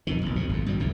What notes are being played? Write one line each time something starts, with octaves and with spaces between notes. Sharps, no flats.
B1 F2 D#3
F1 B1
D2 C3
G#1 F2
G2 B2 G3
F1 C#2 A2 E3